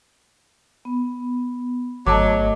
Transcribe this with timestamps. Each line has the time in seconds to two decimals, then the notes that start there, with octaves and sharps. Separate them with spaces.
0.85 B3
2.07 G#1 F#3 A3 A4 D#5 A5 D6